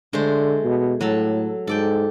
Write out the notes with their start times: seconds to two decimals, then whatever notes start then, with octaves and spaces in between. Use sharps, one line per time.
0.13 D3 G#3 A3 C5
0.64 B2
1.01 A2 F#3 A4
1.67 G#2 A4 D5 G5